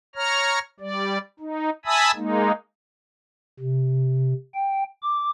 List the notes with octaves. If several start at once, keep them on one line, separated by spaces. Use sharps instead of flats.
C#5 A#5 F6
G3 D5
D#4
E5 G#5 A5 B5 D#6 E6
G#3 A#3 D#4
C3
G5
D6